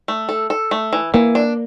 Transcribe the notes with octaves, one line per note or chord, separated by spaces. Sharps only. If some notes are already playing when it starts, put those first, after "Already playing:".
A3
A4
A4
A3
E3
E3 A#3
D4